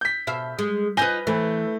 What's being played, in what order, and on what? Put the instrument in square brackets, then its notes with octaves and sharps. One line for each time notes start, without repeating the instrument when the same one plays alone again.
[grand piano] G6 B6
[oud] B2 E5 F5
G#3
[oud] D#4 F4 [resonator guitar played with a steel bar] B4 G#5 [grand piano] G6 A#6 G7
[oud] E3 [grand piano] A3